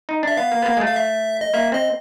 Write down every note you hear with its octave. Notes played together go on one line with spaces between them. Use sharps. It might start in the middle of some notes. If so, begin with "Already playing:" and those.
D#4
D4 E5
B3 F5
A#3
B3
A#3
G#3
A3
F5
E5
D#5
A#3 E5
C4 D#5